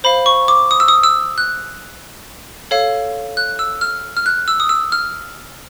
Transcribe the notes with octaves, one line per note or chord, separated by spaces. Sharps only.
C5 F5 B5
C#6
D6
D#6
E6
D#6
E6
F#6
A4 C#5 F5
F#6
E6
F6
F6
F#6
E6
D#6
E6
F6